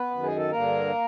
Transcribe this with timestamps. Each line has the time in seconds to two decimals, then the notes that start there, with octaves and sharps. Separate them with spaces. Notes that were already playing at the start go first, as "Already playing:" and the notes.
Already playing: B3 B4
0.10 F#2 D#3
0.23 G#4
0.37 A4
0.51 G2 D3 A#3 A#4